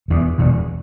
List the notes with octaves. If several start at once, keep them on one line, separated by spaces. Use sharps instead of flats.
E1 E2 B2
E1 E2 B2